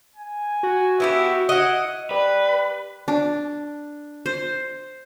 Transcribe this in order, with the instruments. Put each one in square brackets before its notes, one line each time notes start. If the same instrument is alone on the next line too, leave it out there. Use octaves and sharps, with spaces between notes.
[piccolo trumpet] G#5
[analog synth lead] F#4
[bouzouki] B3 E4 G4 [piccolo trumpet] E5
[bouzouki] E4 D#5 [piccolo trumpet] F#5
[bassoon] G3 [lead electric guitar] B4
[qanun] D4
C5